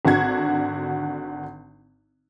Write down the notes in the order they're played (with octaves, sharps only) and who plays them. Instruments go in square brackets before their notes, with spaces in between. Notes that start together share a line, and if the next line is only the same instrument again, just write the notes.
[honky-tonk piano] G#1 D3 D4 F#4 G#6